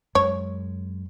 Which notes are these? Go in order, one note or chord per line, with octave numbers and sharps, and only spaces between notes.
F#2 G#3 C#5